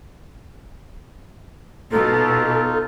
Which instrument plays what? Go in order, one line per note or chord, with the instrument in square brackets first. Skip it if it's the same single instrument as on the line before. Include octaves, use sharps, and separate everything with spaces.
[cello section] B2 [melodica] D#4 F4 [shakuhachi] A4